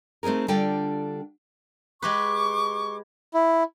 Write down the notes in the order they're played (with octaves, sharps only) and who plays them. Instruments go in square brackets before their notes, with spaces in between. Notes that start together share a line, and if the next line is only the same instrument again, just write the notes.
[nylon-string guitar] A3 C4 D#4 G#4 A#4
D3 G3 D4 F4 A4 G5
[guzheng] G#3 G4 B4 [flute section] C#6 D6
[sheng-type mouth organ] E4